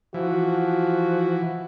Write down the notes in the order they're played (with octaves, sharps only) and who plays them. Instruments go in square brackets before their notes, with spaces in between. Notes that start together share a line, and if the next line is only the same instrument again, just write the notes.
[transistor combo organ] E3 [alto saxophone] F3 [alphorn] F#4